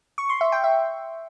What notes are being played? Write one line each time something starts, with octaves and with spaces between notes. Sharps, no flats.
C#6
C6
E5
G5
E5